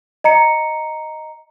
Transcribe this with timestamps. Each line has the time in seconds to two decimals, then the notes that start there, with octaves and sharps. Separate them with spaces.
0.24 D#5 A#5 C#7